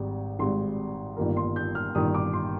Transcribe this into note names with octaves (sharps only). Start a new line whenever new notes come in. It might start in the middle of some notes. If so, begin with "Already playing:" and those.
Already playing: G#1 G#2 G3
G#1 G#2 G3 C6
G1 G2 D#3 A#3
C6
G6
F6
G1 G2 D#3 A#3 D#6
D6
C6